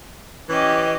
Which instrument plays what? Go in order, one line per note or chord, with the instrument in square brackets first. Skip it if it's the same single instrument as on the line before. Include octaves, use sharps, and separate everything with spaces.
[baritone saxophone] E3 [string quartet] C#4 G4 D#5